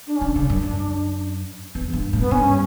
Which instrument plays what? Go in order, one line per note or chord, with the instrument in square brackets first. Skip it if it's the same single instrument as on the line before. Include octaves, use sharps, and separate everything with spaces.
[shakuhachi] D4
C#4
[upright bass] D3 [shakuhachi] D4
[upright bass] C#3
F#2
F#2
E2
G2
A2
[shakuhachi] B3
[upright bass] G2 [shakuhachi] C#4